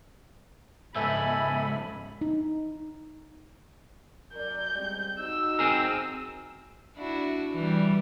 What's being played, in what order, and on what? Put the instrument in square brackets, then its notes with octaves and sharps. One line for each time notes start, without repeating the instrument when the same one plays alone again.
[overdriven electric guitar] C#2 G#2 [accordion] A4 G#5 [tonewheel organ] E5 [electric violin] B5
[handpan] D#4
[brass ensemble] F#2 A#4 D5 [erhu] G6
[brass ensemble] G3 G#3 C4
[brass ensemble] D#4 F#4 [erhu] E6
[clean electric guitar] C4 G#4 A#4
[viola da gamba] D4 E4 F#4
E3 G3